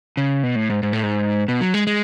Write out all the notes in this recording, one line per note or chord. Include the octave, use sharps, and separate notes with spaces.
C#3
B2
A2
G#2
G#2
A2
G#2
B2
F#3
G#3
G#3